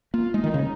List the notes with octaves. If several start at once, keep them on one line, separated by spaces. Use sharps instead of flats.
A#3 F4
G#3 D#4
D#3
C#3